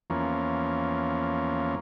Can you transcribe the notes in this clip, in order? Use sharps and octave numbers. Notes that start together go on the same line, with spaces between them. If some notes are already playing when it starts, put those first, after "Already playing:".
E2 F3 A#3 C#4